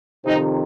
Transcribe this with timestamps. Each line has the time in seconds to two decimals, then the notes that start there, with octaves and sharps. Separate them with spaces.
0.25 F2 C3 D#3 C4 D#4